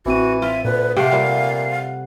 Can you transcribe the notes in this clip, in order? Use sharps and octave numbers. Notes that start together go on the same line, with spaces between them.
A1 E3 C4 F#4 D#7
F4 E5
D2 A#2 B4
C3 A3 G4 F5 F#5
A#2 G3